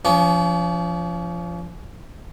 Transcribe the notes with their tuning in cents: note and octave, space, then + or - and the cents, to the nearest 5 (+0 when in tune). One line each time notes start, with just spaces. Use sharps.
F3 -20 C#4 +40